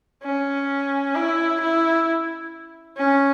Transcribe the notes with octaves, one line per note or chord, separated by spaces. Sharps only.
C#4
E4
E4
C#4